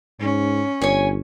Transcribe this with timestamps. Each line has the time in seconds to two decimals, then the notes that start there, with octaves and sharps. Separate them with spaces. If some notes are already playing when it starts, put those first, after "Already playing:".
0.20 G#2 C#4
0.81 G1 C#5 G#5